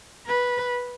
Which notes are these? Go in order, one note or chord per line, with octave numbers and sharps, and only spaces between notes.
B4